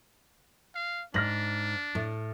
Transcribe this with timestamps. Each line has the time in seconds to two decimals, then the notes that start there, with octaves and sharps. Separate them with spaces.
0.75 F5
1.14 G#2 D4 F6 A#6 F#7
1.95 A2